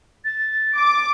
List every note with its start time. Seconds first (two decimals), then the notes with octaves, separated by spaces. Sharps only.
0.25 A6
0.79 D6